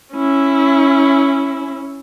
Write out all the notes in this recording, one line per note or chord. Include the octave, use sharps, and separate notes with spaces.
C#4 E4